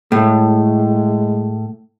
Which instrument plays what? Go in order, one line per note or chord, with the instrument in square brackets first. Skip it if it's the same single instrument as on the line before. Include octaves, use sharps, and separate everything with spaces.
[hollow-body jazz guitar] A2 [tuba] G#3